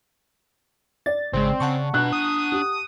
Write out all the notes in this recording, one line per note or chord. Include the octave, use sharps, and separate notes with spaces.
D5 A6
G#1 C#3 G#3 C4
C#3 F#5 A5 C#6
B2 D4 A#5 F#6
D#6
G4